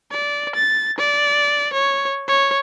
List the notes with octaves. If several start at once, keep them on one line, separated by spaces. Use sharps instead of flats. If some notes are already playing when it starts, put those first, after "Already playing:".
D5
A6
D5
C#5
C#5